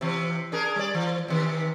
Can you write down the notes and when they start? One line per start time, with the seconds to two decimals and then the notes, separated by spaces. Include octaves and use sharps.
0.01 C3 E3
0.52 D4 G#4 A#4
0.76 G3 D5
0.95 E3
1.28 C3 D#3